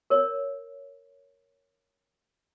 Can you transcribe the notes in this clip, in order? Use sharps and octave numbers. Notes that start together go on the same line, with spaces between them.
A#4 C#5